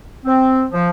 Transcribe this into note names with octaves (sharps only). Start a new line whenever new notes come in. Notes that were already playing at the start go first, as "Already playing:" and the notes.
C4
F3